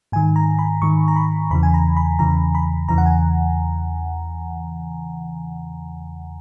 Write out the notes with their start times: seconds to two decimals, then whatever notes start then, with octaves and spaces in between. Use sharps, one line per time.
0.12 G#2 D#3 G#5
0.36 A#5
0.59 B5
0.82 G#2 D#3 C#6
1.08 A#5
1.16 B5
1.50 E2 C#3 E3 B5
1.63 G#5
1.74 A#5
1.96 B5
2.19 E2 C#3 E3 A#5
2.55 B5
2.88 E2 C#3 E3 A#5
2.98 F#5
3.06 G#5